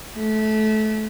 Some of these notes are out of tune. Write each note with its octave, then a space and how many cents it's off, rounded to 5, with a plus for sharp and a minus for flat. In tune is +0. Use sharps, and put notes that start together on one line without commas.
A3 -25